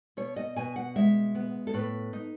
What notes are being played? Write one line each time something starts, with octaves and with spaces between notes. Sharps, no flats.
B2 C#5
D#5
B2 G#5
F#5
G#3 E5
B3
A4
A2 B4
D#4